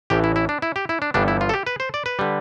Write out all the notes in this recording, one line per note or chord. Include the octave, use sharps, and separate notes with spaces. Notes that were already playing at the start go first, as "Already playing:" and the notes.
A1 A2 E3 G4
E4
E4
D4
E4
G4
E4
D4
G1 G2 E3 G3 B3 D4
E4
F4
A4
G4
B4
C5
D5
B4
D3 G3